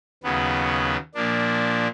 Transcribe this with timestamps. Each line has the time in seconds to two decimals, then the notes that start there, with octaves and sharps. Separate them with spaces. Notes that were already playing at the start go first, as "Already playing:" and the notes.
0.23 D#2 C#3 F#3 B3
1.14 A#2 F3 A#3 D4